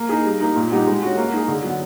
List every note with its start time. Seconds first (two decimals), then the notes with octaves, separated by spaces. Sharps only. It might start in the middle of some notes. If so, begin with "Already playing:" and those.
Already playing: A#3
0.09 D#4 G#4
0.25 G3
0.40 A#3 D#4
0.56 A#2
0.71 G3 B3 D#4 G4
0.87 G#3
1.03 C#4 F#4
1.17 A#3
1.32 D#4 G#4
1.48 D3
1.63 F#3 B3